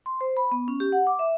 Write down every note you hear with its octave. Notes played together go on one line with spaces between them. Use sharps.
C6
C5
B5
B3
C#4
G4
F#5
D6
E5